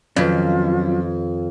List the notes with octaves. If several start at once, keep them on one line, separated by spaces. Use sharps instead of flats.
F2 D#3 F3 F#3 C#4 F4 B4